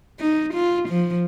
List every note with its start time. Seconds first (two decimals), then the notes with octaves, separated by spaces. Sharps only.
0.19 D#4
0.54 F4
0.89 F3